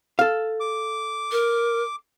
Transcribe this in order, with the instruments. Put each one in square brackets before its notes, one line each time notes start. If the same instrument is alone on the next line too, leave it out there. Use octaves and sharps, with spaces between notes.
[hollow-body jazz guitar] A4 F5
[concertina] D6
[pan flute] A#4